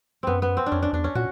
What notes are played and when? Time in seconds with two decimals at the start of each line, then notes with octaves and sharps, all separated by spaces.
0.23 F#2 B3 C4
0.42 B3
0.57 C4
0.66 D4
0.72 F2 C#4
0.83 D4
0.93 E2 D4
1.04 C#4
1.15 A#2 F#4